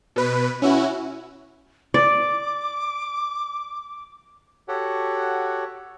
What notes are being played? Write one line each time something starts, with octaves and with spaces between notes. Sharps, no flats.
B2 B4
C#4 E4 F#4
D5 D6
F#4 G4 A4 C#5 F#5